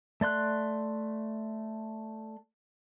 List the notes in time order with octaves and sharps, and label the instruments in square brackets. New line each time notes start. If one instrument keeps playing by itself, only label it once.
[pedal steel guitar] A3 D5 C6 F#6